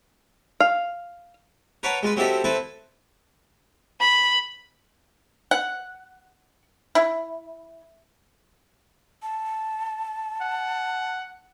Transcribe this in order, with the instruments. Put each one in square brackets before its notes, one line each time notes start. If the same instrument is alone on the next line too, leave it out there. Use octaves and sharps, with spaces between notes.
[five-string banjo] F5
[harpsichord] A#4 B4 C#5 F#5 A5 A#5
G#3 F4 B4
F#3 C4 E4 G4 A4 D#5
C4 E4 A4 B4
[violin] B5
[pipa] F#5
E4
[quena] A5
[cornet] F#5